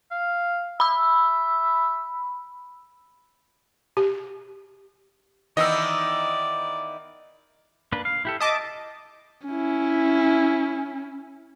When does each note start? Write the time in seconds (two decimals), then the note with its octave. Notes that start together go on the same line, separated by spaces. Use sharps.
0.11 F5
0.80 E5 B5 E6
3.97 G4
5.57 D#3 E3 B3 D5 D#5 E6
7.92 A#3 D4 B4
8.05 F5
8.25 E4 G4 A4
8.40 D#5 E5 A5 D6
9.48 C#4 E4